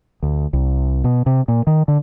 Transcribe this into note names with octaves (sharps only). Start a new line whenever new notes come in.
D2
C2
B2
C3
A#2
D#3
D3